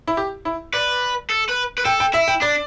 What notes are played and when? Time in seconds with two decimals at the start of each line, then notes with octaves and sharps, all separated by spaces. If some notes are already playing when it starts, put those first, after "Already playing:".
0.08 E4
0.17 G4
0.45 E4
0.73 B4 D5
1.30 A4
1.49 B4
1.78 B4
1.85 A4 G5
2.00 G5
2.13 E4 E5
2.28 G5
2.41 D4 D5